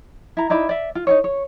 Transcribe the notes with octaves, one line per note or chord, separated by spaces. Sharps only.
E4 A#5
D#4 E4 D5 B5
D5 E5
F4
D#4 F4 C#5
C#5